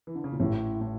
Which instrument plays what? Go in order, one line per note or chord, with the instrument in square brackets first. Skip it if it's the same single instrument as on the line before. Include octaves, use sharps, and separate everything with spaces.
[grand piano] E3
D3
C#3
A#2
[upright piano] A1 [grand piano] A2
[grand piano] A2